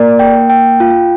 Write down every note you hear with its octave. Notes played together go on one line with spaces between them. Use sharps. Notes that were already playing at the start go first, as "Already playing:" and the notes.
Already playing: A#3 D5
G5
G5
F4